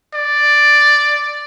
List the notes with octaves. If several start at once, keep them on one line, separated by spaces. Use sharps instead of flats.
D5